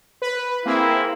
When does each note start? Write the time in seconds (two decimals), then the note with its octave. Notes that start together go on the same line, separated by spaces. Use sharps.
0.22 B4
0.65 A#3 C4 E4 G#4